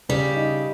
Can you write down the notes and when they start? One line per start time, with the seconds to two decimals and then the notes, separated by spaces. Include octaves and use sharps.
0.09 C#3 G3
0.36 D#4